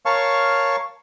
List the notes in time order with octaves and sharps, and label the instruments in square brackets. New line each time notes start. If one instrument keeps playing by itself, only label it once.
[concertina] A#4 C#5 F5 A5 C#6